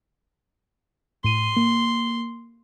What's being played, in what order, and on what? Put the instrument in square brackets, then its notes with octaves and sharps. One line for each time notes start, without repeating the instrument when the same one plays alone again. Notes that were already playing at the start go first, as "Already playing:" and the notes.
[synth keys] A2 D#7 [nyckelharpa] C6
[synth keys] A#3